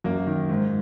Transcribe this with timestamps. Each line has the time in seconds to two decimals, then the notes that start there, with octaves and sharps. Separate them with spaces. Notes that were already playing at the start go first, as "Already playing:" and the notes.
0.04 F#2 A#3
0.27 D#3
0.49 G#2